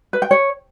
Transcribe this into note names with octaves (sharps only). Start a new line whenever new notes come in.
B4
G5
C#5